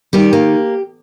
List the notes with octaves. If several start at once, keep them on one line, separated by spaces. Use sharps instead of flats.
D#3 G3 G4
A#3